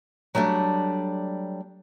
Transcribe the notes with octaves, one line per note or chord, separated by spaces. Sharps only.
F#3 G3 A3 D4